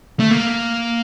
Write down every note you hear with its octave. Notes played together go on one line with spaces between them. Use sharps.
A3
A#3